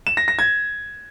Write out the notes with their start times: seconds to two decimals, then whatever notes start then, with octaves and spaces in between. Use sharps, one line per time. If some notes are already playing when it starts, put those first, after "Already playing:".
0.07 E7
0.17 A#6
0.28 A#6
0.39 G#6